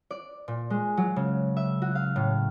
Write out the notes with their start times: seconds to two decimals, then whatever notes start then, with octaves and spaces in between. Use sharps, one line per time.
0.11 D5
0.48 A#2
0.70 G#3
0.97 F#3
1.16 C#3
1.57 E5
1.82 F#4
1.95 F5
2.16 A2